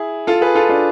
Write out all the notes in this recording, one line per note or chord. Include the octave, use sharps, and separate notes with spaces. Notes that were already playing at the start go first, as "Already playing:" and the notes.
Already playing: E4 G#4
F4 A4
G#4 B4
F4 A4
D4 F4